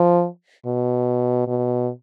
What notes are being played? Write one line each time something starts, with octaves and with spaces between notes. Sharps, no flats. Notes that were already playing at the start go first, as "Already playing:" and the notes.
Already playing: F3
B2
B2